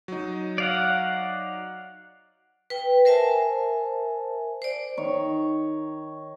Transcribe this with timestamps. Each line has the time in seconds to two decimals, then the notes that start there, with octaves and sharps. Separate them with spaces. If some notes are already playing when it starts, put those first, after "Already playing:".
0.08 F#3 D#4
0.58 D5 F5 F#5
2.70 B4 G5
3.05 A#4 C5 E5 G#5 A5
4.62 C5 D5
4.98 D#3 C#5